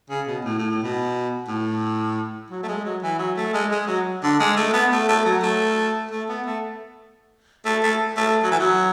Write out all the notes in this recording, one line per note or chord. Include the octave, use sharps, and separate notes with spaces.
C#3
B2
A2
A2
A2
B2
A2
F#3
A3
G#3
F#3
E3
F#3
A3
G#3
G#3
F#3
D3
G#3
A3
B3
A3
A3
F#3
A3
A3
B3
A3
A3
A3
A3
F#3
E3
F#3